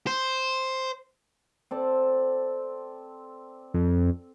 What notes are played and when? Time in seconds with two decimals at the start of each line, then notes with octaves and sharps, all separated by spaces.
0.07 C5
1.71 C4 A4 D5
3.74 F2